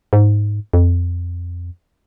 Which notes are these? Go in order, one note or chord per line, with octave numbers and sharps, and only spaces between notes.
G#2
F2